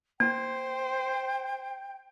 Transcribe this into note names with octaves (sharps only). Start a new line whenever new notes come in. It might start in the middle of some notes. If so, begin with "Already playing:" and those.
A#3 C5 G5